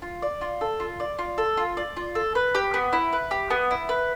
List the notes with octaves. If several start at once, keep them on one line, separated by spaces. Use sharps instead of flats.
F4
D5
F4
A4
F4
D5
F4
A4
F4
D5
F4
A4
B4
G4
B3
E4
B4
G4
B3
E4
B4